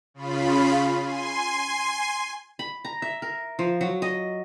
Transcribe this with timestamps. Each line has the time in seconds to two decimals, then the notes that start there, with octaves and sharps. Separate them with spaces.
0.14 C#3 F4 B5
0.99 G#5 C6
2.59 B5
2.85 A#5
3.02 E5
3.22 A#4
3.59 F3
3.81 F#3
4.02 D#5